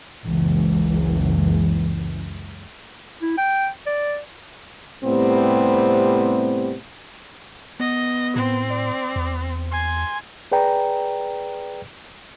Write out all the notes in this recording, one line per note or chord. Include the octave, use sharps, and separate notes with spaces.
F#1 C#2 E3
E4
G5
D5
A2 C3 G3 B3 C4
B3 D#5
A2 C4
D5
E2
G#5 C6
G#4 B4 D5 G5 A#5